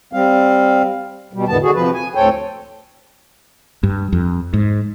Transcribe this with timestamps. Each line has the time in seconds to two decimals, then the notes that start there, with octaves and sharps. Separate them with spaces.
0.13 G3 C4 F5
1.33 B2 G3
1.48 E2 A2 D3 D#3 B3 A5
1.62 D3 F#4 G#4
1.74 C3 F3 B4
1.94 G#5
2.15 D2 A2 C4 A4 C#5 G5
3.83 G2
4.13 F2
4.53 G#2